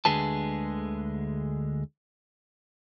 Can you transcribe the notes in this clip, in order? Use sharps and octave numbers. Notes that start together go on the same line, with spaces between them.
D2 D3 G#3 G#4 B4 A5